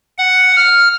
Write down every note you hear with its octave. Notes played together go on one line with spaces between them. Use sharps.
F#5
F6